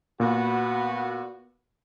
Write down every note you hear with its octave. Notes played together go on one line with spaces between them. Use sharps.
A#2 B3 F#4